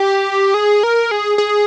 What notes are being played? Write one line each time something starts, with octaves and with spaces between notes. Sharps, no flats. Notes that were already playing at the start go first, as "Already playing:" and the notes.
Already playing: G4
G#4
A#4
G#4
G#4